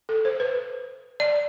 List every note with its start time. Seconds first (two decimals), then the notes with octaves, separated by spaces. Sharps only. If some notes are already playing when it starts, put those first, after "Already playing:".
0.09 A4
0.25 C5
0.40 B4
1.20 D5